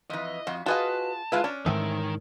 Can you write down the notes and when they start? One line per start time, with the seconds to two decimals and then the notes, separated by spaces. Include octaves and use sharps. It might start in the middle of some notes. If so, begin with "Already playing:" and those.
0.10 F2 E3 D#5
0.47 F2 F#4
0.66 F4 F#4 G#4 B4 D#5 F5 A5
1.32 G#3 E4 F4 B4
1.44 C#4 D4
1.66 G#2 D#3 E3 A3 C4 D#4 A#4